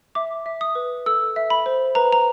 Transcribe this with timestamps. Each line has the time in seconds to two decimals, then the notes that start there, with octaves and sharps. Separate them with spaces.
0.15 E5 D6
0.46 E5
0.61 D#6
0.75 B4
1.06 A4 E6
1.36 E5
1.50 B5
1.66 C5
1.95 B4 A#5
2.13 A#5